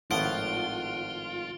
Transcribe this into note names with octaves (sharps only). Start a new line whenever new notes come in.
G#1 A2 F3 F4 F#5 D7 G7